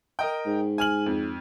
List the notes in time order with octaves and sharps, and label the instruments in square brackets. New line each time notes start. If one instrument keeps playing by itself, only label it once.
[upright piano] A#4 D#5 G5
[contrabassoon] G#2
[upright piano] G#5 F6 F#7
F2